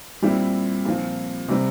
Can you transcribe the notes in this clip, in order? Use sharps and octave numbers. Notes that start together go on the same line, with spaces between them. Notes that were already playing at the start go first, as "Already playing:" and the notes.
A#2 G3 C4 E4 G4
A#2 F3 C4 F4
C3 G3 C4